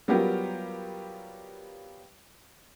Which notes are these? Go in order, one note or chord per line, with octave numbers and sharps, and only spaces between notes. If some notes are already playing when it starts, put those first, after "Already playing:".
F#3 G3 B3 F4 G4 A#4